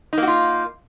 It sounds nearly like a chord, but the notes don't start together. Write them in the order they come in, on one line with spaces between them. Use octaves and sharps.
D#4 A#3 F#4 F4